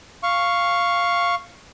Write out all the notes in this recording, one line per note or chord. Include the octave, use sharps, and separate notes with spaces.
F5 C#6